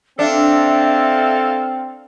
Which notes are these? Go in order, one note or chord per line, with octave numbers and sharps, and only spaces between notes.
C4 D4 A4 E5 F5